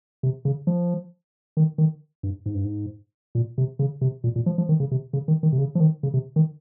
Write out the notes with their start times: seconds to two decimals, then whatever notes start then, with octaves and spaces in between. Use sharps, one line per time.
0.23 C3
0.45 C#3
0.67 F3
1.57 D#3
1.78 D#3
2.23 G2
2.46 G#2
2.55 G2
2.65 G#2
3.35 A#2
3.58 C3
3.79 C#3
4.01 C3
4.24 A#2
4.36 A#2
4.46 F3
4.58 F3
4.69 D#3
4.80 C#3
4.91 C3
5.13 C#3
5.28 D#3
5.43 D#3
5.53 C3
5.58 C#3
5.75 F3
5.80 D#3
6.03 C#3
6.14 C3
6.36 D#3